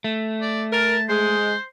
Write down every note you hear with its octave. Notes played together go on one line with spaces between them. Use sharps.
A3
D5
A#4 A5
G#3 C5